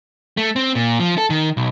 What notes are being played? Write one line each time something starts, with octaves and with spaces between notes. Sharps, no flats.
A3
C4
A#2
F3
A4
D#3
B1